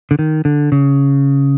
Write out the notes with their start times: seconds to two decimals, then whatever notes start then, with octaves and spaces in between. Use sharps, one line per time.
0.11 D3
0.19 D#3
0.45 D3
0.72 C#3